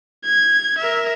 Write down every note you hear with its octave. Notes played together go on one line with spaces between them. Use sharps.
G#6
A#4 E5